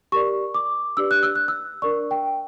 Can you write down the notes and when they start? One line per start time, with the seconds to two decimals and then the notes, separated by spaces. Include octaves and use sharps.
0.12 G4 A#4 D5 C#6
0.54 D6
0.97 D4 G4 B4 D5 E6
1.11 F#6
1.23 E6
1.35 F#6
1.48 E6
1.82 D4 A#4 D5 C#6
2.11 G5